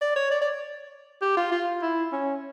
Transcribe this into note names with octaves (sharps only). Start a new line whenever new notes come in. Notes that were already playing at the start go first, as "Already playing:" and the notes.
D5
C#5
D5
D5
G4
F4
F4
E4
C#4